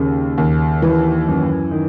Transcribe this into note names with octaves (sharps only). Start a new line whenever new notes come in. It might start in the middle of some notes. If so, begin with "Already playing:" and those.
Already playing: D#2 C#3
D#2
E3
F#2
D#3